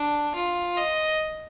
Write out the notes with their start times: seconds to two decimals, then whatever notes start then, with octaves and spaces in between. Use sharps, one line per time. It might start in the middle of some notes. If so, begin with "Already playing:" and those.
Already playing: D4
0.35 F4
0.77 D#5